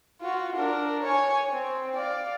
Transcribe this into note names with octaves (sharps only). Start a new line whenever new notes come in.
F4 F#4
D4 A#4
C#5 G#5
C4
D5 F5